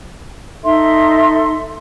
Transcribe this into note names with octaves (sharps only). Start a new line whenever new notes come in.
D#4 A4 E5 C6